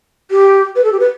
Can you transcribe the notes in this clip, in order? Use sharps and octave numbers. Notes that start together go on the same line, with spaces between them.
G4
B4
A4
G4
B4